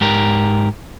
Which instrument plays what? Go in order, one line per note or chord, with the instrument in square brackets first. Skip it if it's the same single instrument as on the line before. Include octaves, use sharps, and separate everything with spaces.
[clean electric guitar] G#2 G4 A#4